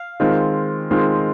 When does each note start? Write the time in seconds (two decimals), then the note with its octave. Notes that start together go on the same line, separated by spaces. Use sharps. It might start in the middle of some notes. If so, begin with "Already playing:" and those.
Already playing: F5
0.20 D#3 G#3 C4 F4
0.91 D#3 G#3 C4 F4